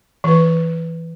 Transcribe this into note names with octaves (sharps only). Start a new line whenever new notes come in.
E3 B4